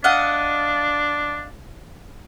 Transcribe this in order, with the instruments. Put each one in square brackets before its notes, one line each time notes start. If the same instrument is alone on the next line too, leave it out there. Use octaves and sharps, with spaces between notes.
[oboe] D4 [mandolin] D#5 F5 F#5